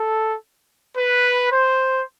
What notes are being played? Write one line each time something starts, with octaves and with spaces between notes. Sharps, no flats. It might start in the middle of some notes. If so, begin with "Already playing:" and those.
Already playing: A4
B4
C5